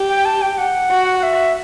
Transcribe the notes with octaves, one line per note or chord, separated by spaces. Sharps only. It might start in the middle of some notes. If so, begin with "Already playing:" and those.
Already playing: G4
G5
A5
G5
F#5
F#4
F#5
E5